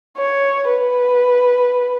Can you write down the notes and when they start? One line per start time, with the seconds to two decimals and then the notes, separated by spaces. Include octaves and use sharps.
0.18 C#5
0.69 B4